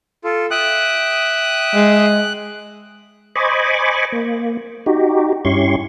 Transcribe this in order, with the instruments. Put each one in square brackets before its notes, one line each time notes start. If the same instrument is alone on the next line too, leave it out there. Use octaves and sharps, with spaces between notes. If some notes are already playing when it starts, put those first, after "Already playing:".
[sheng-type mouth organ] F4 A4
[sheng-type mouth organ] E5 G5 D#6 [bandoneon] F#6
[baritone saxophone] G#3
[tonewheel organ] C5 D#5 G#5 B5 C#6 D6
A#3
D#4 F#4 G4
G2 C#4 E4 G4 C6 C#6